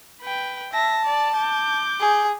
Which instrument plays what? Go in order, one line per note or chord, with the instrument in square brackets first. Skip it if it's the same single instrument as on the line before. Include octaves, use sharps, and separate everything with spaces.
[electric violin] B4 G5
[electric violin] E5 A#6 [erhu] A5
[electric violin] D5
D6 G6
[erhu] G#4